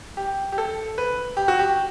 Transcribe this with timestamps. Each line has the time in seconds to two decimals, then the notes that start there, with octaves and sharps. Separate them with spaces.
0.17 G4
0.52 G4
0.58 A4
0.98 B4
1.37 G4
1.48 F#4
1.59 G4